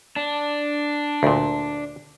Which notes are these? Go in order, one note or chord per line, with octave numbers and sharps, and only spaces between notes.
D4
D2 A#2